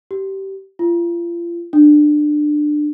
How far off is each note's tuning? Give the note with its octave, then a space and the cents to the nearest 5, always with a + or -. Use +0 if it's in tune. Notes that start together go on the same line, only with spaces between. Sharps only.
G4 -20
F4 -35
D4 +20